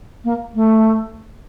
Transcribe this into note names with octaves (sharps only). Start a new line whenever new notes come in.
A#3
A3